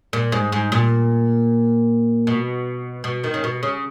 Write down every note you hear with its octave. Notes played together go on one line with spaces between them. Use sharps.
A#2
G#2
G#2
A#2
B2
B2
D#3
C#3
B2
C#3